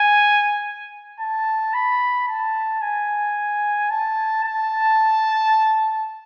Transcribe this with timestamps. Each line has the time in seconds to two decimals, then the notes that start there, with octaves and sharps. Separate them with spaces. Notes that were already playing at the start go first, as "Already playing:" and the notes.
Already playing: G#5
1.20 A5
1.74 B5
2.28 A5
2.82 G#5
3.90 A5
4.44 A5